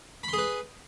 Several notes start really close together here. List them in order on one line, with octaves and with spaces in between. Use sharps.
B5 C6 G#4 B4